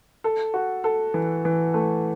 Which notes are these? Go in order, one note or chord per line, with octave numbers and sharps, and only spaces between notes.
A4
F#4
A4
E3
E3
A3